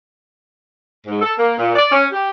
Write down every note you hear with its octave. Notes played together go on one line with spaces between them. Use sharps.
G#2
A4
A#3
A#2
D5
C#4
G4